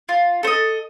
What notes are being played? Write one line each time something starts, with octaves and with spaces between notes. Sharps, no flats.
F4
A4 C5 D#5